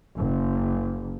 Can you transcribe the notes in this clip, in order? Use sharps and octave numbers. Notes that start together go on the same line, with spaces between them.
F#1